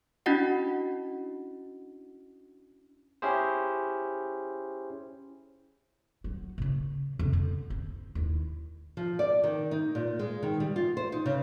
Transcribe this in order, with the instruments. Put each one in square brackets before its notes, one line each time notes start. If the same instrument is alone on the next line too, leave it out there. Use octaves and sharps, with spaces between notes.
[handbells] C#4 D4 E4 F#4 D#5 F#5
[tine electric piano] C#4 E4 G4 G#4 C5
[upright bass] F#3
A#2 C#3
F2 C#3
D3
C4
D#2 E4
[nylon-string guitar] F3
D5
D#3
D#4
A#2
G#3
D#3
G3
F4
C5
D#4
C#3